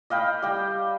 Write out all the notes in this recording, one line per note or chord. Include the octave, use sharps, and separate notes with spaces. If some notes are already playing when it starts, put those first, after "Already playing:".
D#5 F5 G5 B5
G3 G5